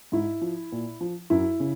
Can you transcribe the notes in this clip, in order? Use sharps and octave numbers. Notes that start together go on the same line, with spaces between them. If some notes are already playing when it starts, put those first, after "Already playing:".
G#2 E4
F3
A#2
F3
F#2 E4
C#3